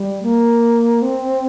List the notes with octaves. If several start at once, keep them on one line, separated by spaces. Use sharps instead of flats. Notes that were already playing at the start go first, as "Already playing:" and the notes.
Already playing: G3
A#3
C4